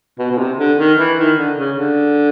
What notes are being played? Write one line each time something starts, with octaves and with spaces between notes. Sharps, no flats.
B2
B2
C3
D3
D#3
E3
D#3
D3
C#3
D3